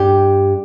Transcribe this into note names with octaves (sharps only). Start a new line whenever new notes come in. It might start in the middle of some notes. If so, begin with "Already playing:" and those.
Already playing: G2 G4